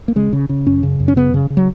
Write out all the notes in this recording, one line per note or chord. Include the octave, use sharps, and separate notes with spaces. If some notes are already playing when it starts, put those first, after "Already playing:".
A#3
C#3 G#3
C#3
C#3
F#2 C#4
C#3
F#2
C#4
C#3 B3
C#3
C#3
F#3